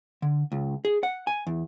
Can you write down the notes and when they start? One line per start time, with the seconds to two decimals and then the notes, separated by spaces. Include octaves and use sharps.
0.22 D3
0.52 C#2
0.85 G#4
1.03 F#5
1.27 G#5
1.47 E2